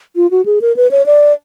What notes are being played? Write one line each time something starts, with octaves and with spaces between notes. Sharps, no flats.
F4
F#4
G#4
A#4
B4
C#5
D5